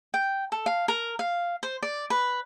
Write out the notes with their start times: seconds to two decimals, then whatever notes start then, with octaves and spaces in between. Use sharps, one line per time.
0.14 G5
0.52 A4
0.66 F5
0.88 A#4
1.19 F5
1.63 C5
1.83 D5
2.10 B4